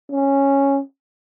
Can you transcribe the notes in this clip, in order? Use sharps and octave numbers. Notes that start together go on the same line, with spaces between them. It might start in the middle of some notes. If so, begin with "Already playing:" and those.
C#4